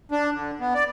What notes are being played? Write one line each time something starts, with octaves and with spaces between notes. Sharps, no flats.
D4
D3
B3
D5